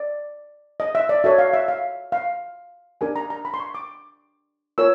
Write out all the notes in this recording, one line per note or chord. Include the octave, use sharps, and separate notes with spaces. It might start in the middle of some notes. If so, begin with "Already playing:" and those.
Already playing: D5
D#5
E5
D5
F#4 A4 C#5 E5
F5
E5
F5
F5
D4 G4 A#4 G#5
A#5
A#5
B5
C6
C#6
D6
F4 A#4 C#5 E6